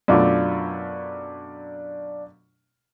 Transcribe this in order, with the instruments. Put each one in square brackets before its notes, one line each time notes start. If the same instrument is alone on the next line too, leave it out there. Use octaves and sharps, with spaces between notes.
[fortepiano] F#2 B2 A3 [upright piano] D4 F4 D6